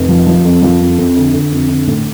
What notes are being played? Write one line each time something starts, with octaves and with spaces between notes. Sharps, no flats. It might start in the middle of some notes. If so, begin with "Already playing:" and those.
Already playing: F1
F3
F3
F2
F3
F2
F2
D3
D3
F2
D3
A2